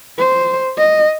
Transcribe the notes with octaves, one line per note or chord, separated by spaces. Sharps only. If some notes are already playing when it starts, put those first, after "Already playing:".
C5
D#5